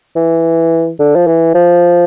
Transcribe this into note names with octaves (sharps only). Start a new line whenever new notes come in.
E3
D3
F3
E3
F3